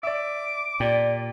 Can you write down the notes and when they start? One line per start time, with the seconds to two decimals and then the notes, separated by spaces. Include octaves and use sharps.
0.03 D5 E5 D6
0.80 A#2 G4 D5